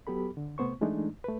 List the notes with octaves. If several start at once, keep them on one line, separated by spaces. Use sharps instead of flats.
F#3 B3 G4 A4 B5
D3
C3 A3 B3 C5 C#6
E3 G#3 A3 D4 D#4
A3 B4